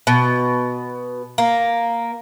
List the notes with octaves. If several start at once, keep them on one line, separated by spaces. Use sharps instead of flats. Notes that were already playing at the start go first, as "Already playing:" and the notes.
B2
A#3